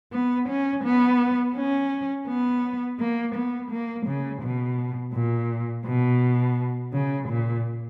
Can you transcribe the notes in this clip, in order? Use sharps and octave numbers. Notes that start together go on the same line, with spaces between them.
B3
C#4
B3
C#4
B3
A#3
B3
A#3
C#3
B2
A#2
B2
C#3
A#2